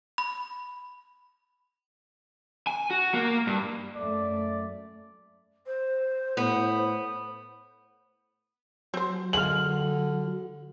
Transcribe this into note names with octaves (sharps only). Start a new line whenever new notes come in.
B5
G#5
F#4
A#3
G2
F#2 A3 D5
C5
A2 B3
F#3 C4 F#4 C5
D3 G#3 A#3 C4 F6 F#7